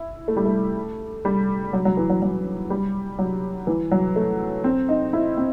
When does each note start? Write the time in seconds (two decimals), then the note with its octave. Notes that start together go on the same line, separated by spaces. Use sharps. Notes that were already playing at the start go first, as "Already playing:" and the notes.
Already playing: E4
0.28 A3
0.37 G3
0.46 A3
1.25 G3
1.73 F#3
1.85 F#3
1.97 E3
2.09 F#3
2.22 F#3
2.70 G3
3.19 F#3
3.67 E3
3.91 F#3
4.16 A3
4.64 C4
4.89 D#4
5.13 E4
5.37 C4